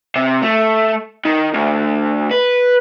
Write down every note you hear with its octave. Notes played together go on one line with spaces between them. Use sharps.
C3
A3
D#3
D2
B4